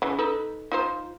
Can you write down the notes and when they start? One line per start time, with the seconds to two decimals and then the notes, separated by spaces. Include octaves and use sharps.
0.02 C#3 E3
0.19 D#4 A4 B4
0.72 D#4 F4 C5